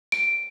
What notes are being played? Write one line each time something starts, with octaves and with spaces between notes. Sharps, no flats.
D7